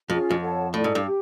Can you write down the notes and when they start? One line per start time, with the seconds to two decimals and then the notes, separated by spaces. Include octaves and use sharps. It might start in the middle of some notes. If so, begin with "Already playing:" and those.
0.10 F2 C#4 F4 G#4
0.31 F2
0.41 A4 C#5 F#5 A5
0.74 A2 E4 A4 D5
0.84 G#2
0.95 G2
1.07 G4